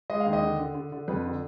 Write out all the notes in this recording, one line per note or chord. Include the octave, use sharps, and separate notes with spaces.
G#3 D#5
F5
D#2
D#5
D3
D3
D3
D3
F2 B4
D3